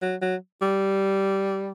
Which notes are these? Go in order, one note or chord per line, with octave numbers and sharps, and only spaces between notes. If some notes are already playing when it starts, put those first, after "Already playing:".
F#3
F#3
G3